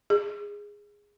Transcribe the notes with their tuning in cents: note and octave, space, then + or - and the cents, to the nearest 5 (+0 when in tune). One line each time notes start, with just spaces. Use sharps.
G#4 -10